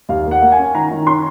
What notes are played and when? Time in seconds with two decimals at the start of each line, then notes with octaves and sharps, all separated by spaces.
0.09 D#2 F5
0.26 A#3
0.31 F#5
0.42 A#3
0.52 G#5
0.58 C#4
0.75 D#3 A#5
0.91 D#3
1.07 C#4 C6